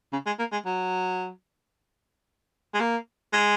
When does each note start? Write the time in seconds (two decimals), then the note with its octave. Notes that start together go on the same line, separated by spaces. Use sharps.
0.12 C#3
0.26 G#3
0.39 A#3
0.52 G#3
0.66 F#3
2.74 G#3
2.80 A#3
3.33 G#3